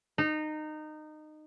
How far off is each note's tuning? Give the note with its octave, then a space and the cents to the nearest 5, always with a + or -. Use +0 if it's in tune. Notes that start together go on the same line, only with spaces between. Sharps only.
D#4 -20